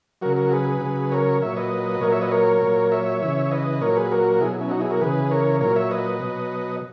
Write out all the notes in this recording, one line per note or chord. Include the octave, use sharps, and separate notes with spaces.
C#3 F#3 F#4 A#4
F#4 A#4
G#4 B4
C#3 F#3
A#4 C#5
A#2 F#3 C#5 E5
B4 D#5
A#2 F#3 A#4 C#5
C#5 E5
B4 D#5
A#4 C#5
A#2 F#3
C#5 E5
C#3 E3
E5
B4 D#5
A#2 F#3 A#4 C#5
G#4 B4
F#4 A#4
B2 F#3 E4 G#4
C#4 E4
D#4 F#4
E4 G#4
F#4 A#4
C#3 E3 G#4 B4
A#4 C#5
A#2 F#3 A#4 C#5
C#5 E5
B4 D#5
B2 F#3